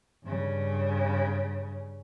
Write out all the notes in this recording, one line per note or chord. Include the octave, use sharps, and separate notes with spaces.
G2 C#3